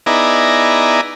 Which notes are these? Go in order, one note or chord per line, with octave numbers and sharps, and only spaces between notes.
B3 D#4 E4 G#4 D5 A#5